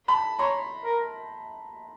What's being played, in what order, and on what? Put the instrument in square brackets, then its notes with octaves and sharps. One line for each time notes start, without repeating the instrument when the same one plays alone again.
[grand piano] A5 B5
[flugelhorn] C#5 [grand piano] A#5 C6
[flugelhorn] A#4